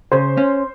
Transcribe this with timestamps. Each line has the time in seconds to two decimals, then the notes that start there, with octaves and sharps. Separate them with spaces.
0.12 C#3 C5
0.37 C#4